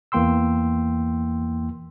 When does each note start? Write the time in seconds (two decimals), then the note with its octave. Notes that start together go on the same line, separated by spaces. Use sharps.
0.12 E2 E3 A#3 G5 C6 E6